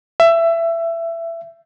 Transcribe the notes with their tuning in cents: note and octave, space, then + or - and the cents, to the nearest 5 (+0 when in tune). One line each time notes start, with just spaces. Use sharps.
E5 +20